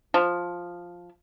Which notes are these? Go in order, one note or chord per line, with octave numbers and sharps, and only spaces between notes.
F3